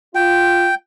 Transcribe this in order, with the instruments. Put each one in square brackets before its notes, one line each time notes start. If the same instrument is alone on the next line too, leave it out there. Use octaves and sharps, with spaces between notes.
[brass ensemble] F4 [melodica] G5